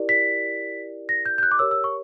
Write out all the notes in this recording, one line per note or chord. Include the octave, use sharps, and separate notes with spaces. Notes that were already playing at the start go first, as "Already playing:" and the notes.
Already playing: E4 G4 A#4 D5
B6
A#6
G6
G6
F#6
D6
G4 A#4 C#5 E6
E6
C#6